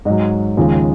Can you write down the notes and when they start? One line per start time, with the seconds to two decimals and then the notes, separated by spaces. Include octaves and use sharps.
0.05 G#2 F#3 D#5
0.57 D#2 C#3 F3 G#3